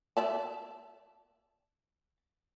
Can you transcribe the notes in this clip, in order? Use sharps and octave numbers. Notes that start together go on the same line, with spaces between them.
D5 E5 A5